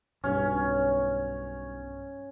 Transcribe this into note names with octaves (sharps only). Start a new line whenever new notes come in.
B1 G2 C#4